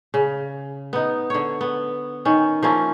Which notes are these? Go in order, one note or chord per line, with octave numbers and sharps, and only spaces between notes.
C#3
B3 D#4
D3 C#5
B3
D#3 C#4
F3 A#3 C#4 E4